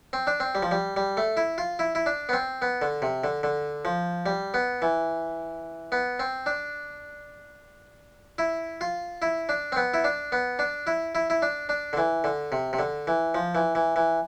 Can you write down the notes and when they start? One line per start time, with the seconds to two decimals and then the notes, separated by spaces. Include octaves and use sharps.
0.13 C4
0.27 D4
0.40 C4
0.55 G3
0.63 F3
0.71 G3
0.96 G3
1.17 A3
1.37 E4
1.58 F4
1.79 E4
1.95 E4
2.06 D4
2.29 B3
2.33 C4
2.62 B3
2.82 D3
3.02 C3
3.24 D3
3.43 D3
3.85 F3
4.26 G3
4.54 B3
4.82 E3
5.92 B3
6.20 C4
6.46 D4
8.38 E4
8.81 F4
9.22 E4
9.49 D4
9.72 C4
9.76 B3
9.94 E4
10.04 D4
10.32 B3
10.59 D4
10.87 E4
11.15 E4
11.30 E4
11.42 D4
11.69 D4
11.93 D3
11.97 E3
12.24 D3
12.52 C3
12.73 C3
12.79 D3
13.07 E3
13.35 F3
13.55 E3
13.75 E3
13.96 E3